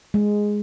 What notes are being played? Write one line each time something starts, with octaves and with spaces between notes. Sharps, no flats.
G#3